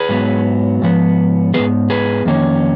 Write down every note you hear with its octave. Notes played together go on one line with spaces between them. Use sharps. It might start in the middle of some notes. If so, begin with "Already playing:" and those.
Already playing: G#4 B4
G#2 F#3 B3
G#2 F3 B3
G#2 F3 B3 G#4 B4
G#4 B4
F2 D#3 A#3 C#4